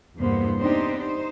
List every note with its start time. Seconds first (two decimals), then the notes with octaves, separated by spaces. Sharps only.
0.19 E2 G2 C3 A#3 B3 C5
0.60 B3 C4 D4 D#4 G4 C5
0.99 D#4 C5